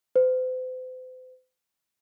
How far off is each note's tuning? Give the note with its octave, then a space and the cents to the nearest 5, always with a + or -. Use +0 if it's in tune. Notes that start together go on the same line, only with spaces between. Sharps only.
C5 -40